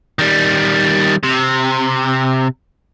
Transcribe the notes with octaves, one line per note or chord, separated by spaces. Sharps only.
D#3 G3
C3